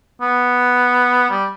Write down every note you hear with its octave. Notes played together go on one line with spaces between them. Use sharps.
B3
G3